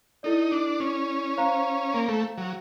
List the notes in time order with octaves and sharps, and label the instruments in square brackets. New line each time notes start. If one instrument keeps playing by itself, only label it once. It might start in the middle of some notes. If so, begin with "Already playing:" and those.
[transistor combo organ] D#4 [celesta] E4 A4 D5
[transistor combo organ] D4
C#4
[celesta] C5 F5 A#5
[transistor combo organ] A#3
A3
F#3